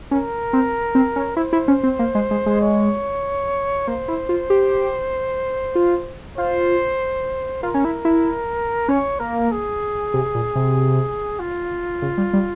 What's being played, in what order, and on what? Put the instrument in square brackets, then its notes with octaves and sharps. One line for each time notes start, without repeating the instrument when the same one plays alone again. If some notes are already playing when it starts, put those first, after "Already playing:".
[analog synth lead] C#4 [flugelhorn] A#4
[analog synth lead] C4
C4
C#4
[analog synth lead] E4 [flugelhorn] C5
[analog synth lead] E4
C#4
C4
A#3
G#3
G#3
G#3
[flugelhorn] C#5
[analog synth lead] A#3 [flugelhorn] C5
[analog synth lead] E4
F4
G4
F4
[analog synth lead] F4 [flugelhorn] C5
[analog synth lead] F4 [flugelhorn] A#4
[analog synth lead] C#4
E4
E4
[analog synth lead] C#4 [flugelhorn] C#5
[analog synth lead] A#3 [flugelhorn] A#4
[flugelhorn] G#4
[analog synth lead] C3
A#2
C3
[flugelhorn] F4
[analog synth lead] C#3
G3
G3